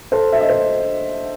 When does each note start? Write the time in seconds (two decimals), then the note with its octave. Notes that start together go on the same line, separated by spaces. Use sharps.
0.12 A4 C5
0.32 E5
0.41 D#5
0.49 C5